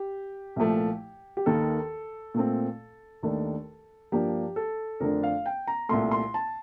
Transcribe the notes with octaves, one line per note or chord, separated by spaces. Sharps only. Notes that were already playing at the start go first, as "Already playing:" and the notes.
Already playing: G4
C2 A#2 F3 A3
G4
D#2 D#3 A#3 A4
A#2 A3 C4
D#2 D#3 A3 D4
G2 F3 A#3 D4 G4
A4
F2 D3 A3 D4 A#4
F5
G5
A#5
C2 A#2 A3 C6
C6
A5